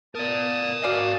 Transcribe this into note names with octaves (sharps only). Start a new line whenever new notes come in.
B3 A#4 D5 A5 D#6
F#4 A#4 D5 F5 G#5